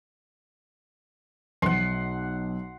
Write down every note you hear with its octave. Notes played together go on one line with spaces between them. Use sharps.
B1 E3 F3 F#5 C6